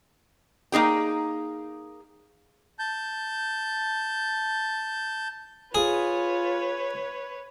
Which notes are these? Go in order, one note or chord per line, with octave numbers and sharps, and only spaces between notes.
A#3 D#4 G#4 G5
A5 G6
F4 G#4 B4 C#5